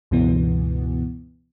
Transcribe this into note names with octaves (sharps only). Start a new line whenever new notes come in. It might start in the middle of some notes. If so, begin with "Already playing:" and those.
C#2 G2 B2 E3 B3